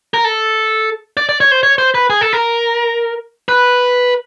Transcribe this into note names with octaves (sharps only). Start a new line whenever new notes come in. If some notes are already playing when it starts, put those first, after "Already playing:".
A#4
A4
D5
D5
C#5
C5
C#5
C5
B4
G#4
A4
A#4
B4